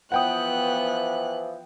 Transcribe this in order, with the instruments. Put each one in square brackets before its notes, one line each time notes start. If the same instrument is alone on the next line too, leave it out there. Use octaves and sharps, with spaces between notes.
[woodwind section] E3 F3 [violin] B3 F#6 [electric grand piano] F#5 G5 D#6